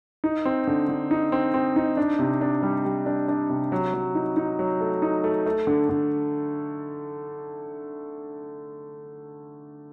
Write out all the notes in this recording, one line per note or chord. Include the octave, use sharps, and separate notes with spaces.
D#4
C4
D3
D3
D#4
C4
C4
D#4
D4
C3
D4
G3
G3
D4
D4
C3
F#3
F#3
D#4
D#4
F#3
A3
D#4
A3
A3
D3
D3